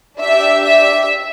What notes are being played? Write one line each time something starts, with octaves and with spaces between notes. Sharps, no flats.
D4 G4 E5
E5